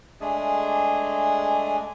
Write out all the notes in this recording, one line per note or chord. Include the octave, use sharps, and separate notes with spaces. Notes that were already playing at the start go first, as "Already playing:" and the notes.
G#3 A3 D4 G#4